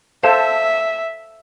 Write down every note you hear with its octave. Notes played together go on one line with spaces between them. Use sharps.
A4 C5 E5 F5 A5